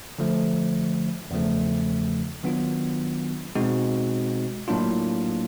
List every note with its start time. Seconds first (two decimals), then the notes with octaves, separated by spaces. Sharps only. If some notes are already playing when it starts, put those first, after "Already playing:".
0.19 D3 F3 A3
1.31 E2 C#3 F3 A3
2.43 D#3 F#3 B3 D4 F4
3.56 B2 G#3 C4 D#4 F#4
4.68 A2 F#3 A#3 D4 F4